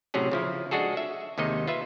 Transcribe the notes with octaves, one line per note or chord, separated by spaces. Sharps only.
A2 C3 F#3 C#4 G#4
C#3 F3 E4
G#3 D4 F#4 G#4 A4
E5
D#2 C3 D#3 G#3 D#4 D#5
F4 B4 E5